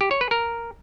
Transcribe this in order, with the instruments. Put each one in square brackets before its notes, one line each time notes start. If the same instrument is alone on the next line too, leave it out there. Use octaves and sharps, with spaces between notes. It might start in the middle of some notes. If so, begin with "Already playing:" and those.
[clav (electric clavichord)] G4
C#5
B4
A#4